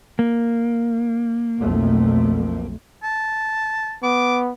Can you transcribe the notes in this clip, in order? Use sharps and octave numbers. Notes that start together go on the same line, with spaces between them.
A#3
B1 F2 A3
A5
B3 D6